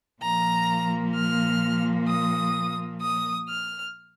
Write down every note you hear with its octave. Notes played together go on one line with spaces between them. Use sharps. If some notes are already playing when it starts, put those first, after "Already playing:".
A#2 F3 A#3 A#5
F6
D#6
D#6
F6